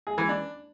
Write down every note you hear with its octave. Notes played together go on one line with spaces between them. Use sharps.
G#4
E3
D4